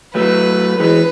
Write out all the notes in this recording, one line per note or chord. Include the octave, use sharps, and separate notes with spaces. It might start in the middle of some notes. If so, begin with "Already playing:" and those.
F#3 A3 B4
E3 G#3 B4